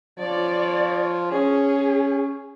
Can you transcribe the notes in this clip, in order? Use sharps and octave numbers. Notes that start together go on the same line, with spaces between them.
F3 C#5 D5
C#4 G#4